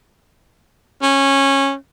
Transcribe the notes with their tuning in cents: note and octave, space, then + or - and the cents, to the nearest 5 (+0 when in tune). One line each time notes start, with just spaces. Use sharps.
C#4 -15